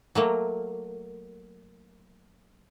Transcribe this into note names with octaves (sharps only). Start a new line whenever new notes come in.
F#3 A3 A#3